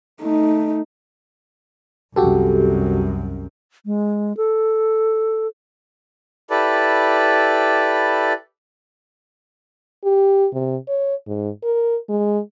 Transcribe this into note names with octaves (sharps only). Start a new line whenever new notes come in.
A3 D#4
C2 F#2 F#4 G4 A4
G#3
A4
E4 G4 A4 B4 D5
G4
C3
C#5
G#2
A#4
G#3